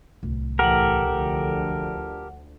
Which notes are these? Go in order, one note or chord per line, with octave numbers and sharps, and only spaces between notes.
D1 C2
A2 E3 G4 A4 A#4 F#5 F#7
D2 D3 F3